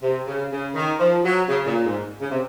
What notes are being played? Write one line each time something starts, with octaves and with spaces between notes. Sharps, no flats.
C3
C#3
C#3
D#3
F3
F#3
C#3
A#2
G#2
C#3
C3